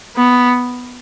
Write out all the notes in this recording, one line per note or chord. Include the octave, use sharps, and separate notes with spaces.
B3